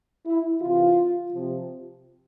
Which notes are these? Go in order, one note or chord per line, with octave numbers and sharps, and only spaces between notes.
E4
C3 E3 F4
C3 F3